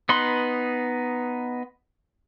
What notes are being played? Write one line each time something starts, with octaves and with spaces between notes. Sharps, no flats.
B3 D#4 B4 B5 C6